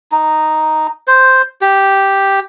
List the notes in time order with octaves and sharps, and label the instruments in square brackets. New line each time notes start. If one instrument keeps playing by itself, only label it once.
[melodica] D#4
C5
G4